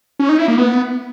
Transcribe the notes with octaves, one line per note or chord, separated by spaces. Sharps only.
C#4
D#4
E4
A#3
B3